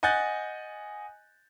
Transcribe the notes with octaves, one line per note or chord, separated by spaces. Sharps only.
D#5 F#5 G#5 F#6 G6 A6